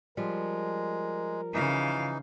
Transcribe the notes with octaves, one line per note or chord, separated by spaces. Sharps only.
F3 G3 G#3 A#4
C#3 E3 D#4 F5